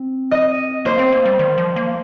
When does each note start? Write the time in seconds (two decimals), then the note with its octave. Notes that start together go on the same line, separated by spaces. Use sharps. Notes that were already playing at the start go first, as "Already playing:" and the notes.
Already playing: C4
0.31 D#5
0.85 A#3 C5
0.99 C4
1.12 A#3
1.26 G3
1.39 D#3
1.58 F3
1.76 A#3